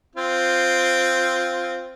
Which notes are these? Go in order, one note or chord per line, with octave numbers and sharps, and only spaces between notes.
C4 F4